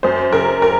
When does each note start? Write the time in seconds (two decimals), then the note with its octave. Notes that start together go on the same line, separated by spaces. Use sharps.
0.03 F#2 C5
0.33 C#3 A#4
0.62 A#4